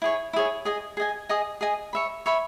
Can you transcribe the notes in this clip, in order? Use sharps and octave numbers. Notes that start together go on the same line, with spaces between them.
E4 G#4 C#5
E4 G#4 C#5
G#4 D#5 G#5
G#4 D#5 G#5
G#4 D#5 G#5 D#6
G#4 D#5 G#5 D#6
C#5 E5 B5
C#5 E5 B5